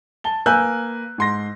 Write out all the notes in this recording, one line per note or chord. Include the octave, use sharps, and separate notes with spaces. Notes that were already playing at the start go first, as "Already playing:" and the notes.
A5 G7
A#3 B4 G#5 E6 F#6 G6
G#2 C6 A#6